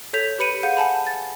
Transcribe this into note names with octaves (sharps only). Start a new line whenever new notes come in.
A4 C#5 G6 B6 F7
G4 B4 B5 C#7 D#7
G#4 F5 F#5 G6
F#5 G#5 A5 B5
A6